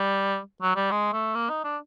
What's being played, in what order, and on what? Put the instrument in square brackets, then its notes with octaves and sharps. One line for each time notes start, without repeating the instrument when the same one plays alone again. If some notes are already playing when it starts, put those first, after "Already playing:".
Already playing: [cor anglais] G3
F#3
G3
G#3
A3
A#3
D#4
D4